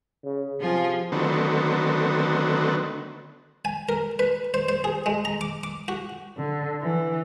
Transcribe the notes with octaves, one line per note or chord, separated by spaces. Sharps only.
C#3
C3 F3 F4 G#4
D3 D#3 F#3 A3 B3 C4
G#5
A#4
B4
C5
C5
G#4
G#3
A#5
D6
D6
F#4
D3
E3